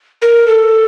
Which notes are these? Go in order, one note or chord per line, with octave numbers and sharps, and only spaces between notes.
A#4
A4